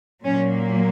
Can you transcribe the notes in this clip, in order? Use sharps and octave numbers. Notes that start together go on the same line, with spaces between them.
A#2 F#3 A#3 C#4